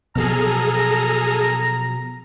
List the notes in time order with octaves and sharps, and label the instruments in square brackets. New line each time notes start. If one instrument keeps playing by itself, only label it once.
[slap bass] B2 F3 F#3 [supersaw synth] G#4 A4 F6 [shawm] A#5